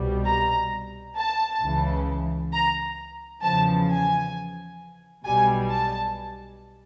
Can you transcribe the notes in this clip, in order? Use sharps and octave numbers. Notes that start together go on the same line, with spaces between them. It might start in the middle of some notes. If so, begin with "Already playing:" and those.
Already playing: C2 B2 G3
A#5
A5
C#2 C#3 E3
A#5
E2 C#3 F3 A5
G#5
B1 B2 G3 G#5
A5